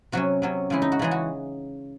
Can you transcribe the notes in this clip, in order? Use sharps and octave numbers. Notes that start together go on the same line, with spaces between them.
C3 F#3 C#4 F#4
C3 F#3 C#4
C#3 E3 G#3 E4
D#4
F#4
C#3 E3 G#3 G#4
F#4